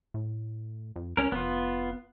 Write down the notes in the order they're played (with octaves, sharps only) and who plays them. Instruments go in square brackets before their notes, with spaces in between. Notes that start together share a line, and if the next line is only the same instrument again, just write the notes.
[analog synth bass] A2
F2
[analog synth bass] C#2 [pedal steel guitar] C#4 A#4
[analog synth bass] F1 [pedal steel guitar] B3 F4